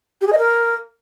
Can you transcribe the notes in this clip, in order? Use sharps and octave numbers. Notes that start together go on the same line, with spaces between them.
G4
G#4
D#5
A#4